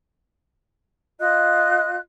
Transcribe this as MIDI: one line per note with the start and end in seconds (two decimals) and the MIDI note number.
1.20 1.95 65
1.20 1.95 75
1.20 1.95 90